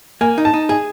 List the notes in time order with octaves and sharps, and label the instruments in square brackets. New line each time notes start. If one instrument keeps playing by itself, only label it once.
[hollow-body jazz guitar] A#3 [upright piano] G#5
[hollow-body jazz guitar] D#4
[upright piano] A5
[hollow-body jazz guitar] D#4
[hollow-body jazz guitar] G#4 [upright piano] G#5